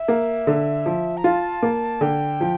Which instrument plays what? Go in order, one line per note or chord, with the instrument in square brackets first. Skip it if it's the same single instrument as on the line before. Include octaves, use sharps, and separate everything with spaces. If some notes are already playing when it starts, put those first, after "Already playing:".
Already playing: [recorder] E5
[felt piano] A#3
D3
F3
[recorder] A#5
[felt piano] F4 [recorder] A5
[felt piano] A#3
[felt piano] D3 [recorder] G5
[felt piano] F3